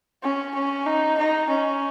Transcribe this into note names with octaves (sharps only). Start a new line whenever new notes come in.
C#4
C#4
D#4
D#4
C#4